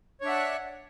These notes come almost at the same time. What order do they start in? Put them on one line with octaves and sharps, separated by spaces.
C#5 D4 E5 F#5